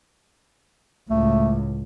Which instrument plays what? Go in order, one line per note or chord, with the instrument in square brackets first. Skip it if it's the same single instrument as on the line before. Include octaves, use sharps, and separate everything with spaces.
[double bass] C#2 A2 [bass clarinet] A3